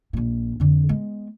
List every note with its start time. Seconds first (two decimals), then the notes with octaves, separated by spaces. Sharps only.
0.13 A#1 A#2
0.60 F2 D3
0.89 G#3 B3